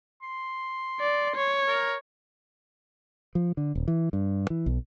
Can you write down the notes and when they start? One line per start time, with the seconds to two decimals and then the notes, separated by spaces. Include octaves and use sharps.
0.22 C6
1.00 D5
1.36 C#5
1.68 A#4
3.35 F3
3.57 D3
3.75 D#1
3.88 E3
4.13 G2
4.50 E3
4.66 B1